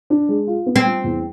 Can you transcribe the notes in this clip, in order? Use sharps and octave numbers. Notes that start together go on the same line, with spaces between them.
D4
G#3
F4
B3
C4
F4
E2